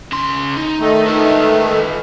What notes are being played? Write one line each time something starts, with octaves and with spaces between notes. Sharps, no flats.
C#3 C6
D#4
D#3 A3
F4 B4